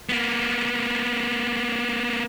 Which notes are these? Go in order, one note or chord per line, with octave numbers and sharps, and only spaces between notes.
A#3 B3